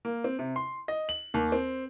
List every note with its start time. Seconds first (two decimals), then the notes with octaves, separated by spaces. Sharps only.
0.05 A#3
0.24 C4
0.39 C3
0.56 C6
0.88 D#5
1.09 F#7
1.34 D#2
1.52 C4